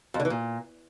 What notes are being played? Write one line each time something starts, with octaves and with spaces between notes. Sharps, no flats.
F2
D3
E3
A#2